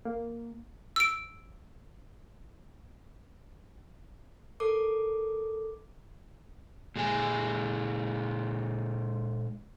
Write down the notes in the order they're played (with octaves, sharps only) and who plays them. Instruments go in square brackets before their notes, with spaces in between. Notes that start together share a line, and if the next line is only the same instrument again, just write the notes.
[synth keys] A#3
[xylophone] E6 D7
[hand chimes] A4 A#4 D6
[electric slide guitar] A#2 G#3 G#5